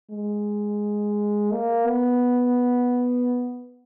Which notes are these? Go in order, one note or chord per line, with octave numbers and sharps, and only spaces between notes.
G#3
A#3
B3